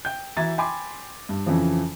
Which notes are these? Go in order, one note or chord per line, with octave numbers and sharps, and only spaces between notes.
G5 G6
E3 F#4 E5 A#5 G#6 A6
G5 G#5 B5 C6 D6
G2
F2 C#3 E3 F3